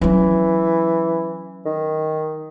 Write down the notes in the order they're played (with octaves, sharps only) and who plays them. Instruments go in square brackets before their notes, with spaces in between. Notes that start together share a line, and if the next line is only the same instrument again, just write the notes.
[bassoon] E3 [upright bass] F#3 C#4
[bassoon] D#3